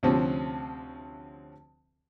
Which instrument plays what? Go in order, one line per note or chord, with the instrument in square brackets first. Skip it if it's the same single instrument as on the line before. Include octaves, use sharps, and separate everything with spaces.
[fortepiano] D2 C3 F3 C4 C#4